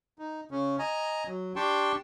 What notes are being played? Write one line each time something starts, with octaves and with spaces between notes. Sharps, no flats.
D#4
C#3 C#4
D#5 G#5 A#5
F#3
D4 G4 G5 A5 C6 C#6